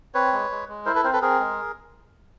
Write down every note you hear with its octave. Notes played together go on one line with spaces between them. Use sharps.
C4 B4 C#5
G#3
G#3
G#3
E4 A#4 C5
A4 B4
C4 A#4 C5
A4 B4
C4 G#4 A#4
G#3